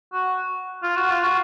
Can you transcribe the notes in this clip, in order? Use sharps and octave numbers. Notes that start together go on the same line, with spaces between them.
F#4
F4
F#4
F4
F#4